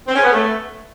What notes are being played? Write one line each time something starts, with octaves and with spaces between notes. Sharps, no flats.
C4
C#4
B3
A3